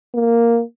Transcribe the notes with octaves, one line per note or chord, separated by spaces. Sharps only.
A#3